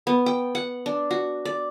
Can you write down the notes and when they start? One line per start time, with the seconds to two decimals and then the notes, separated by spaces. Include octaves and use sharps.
0.07 B3
0.26 G5
0.55 F#5
0.86 D4
1.11 F#4
1.45 D5